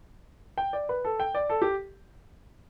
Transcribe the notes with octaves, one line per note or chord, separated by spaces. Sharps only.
G5
D5
B4
A4
G5
D5
A4
G4